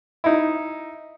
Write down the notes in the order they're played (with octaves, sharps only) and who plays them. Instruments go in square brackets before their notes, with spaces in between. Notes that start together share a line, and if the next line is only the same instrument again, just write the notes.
[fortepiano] D#4 E4